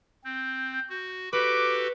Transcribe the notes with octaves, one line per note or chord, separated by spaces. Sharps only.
C4 G6
F#4
F#4 G4 A4 B4 D6 F#6